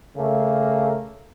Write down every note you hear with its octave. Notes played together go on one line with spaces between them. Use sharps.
C#3 A3 A#3